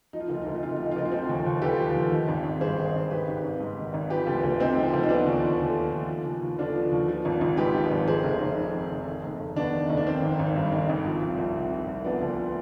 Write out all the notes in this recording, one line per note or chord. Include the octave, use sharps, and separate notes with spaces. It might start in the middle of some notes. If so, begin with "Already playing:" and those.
F3 D#4
F4
D#4
D2
F4
D#4
D2 F4
D#4
C3 F4
D#4
F3 F4
D#4
F4
D2 D#4
F4
F3 C4 D#4
D#2
D#2
D3 G4 B4
F3
D#2
D#3
G#1
G#1
G2 G#4 C5
D#3
G#1
D#3 G4 B4
G#1
G#1
G#2
D#3
G#1
F3 G4 B4
D2
D2
C3 C4 D#4
F3
D2
D#4
F3 B3 D4
D#2
D#2
D3
F3
D#2
F3
D#2
D#2
D3 D4 F4
F3
D#2
F3
G#1
G#1
G#2 G4 B4
F3
G#1
D#3 G#4 C5
F1
F1
F2
D#3
F1
D#3
F1
F1
D#2 B3 D4
D#3
F1 D#4
D4
D#3 C4
G#1
G#1
G2
D#3
G#1
F3
C2
C2
C3
F3
C2
F3 B3 D4
D2